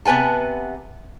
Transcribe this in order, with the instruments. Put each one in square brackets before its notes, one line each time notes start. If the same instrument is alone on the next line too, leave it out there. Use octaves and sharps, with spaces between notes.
[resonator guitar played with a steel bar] C3 B3 B4 G#5 A5